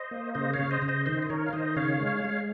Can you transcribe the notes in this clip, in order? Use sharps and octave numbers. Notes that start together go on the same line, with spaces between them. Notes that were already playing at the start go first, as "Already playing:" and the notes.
Already playing: C5 D#5
A#3
C#3 C5 D#5
C#5 F5
C#3
C5 D#5
C#3
C5 D#5
D#3 C5 D#5
D#5
D#3 A#4 C#5
F5
D#3 C5 D#5
C#3 C#5 F5
G#3
G#3